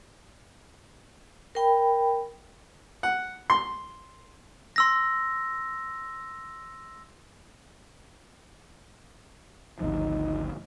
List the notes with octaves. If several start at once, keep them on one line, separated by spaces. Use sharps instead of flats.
A#4 G5 B5
F#5
C6
C6 E6 A#6
G#1 D2 F3 D#4